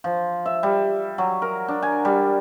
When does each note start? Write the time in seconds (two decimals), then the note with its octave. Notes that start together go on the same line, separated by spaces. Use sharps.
0.04 F3
0.46 E5
0.63 G3
1.18 F#3
1.42 A#4
1.68 D4
1.82 G#5
2.05 G3